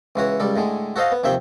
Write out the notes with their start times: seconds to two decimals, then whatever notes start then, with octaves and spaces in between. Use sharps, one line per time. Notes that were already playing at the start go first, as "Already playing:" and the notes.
0.16 C#2 E3 F#4 C#5
0.40 C#2 G3 A4
0.56 A2 D3 G#3
0.96 F#4 A4 C5 D#5 F5
1.12 B3
1.24 D#2 C3 F3 E5 G5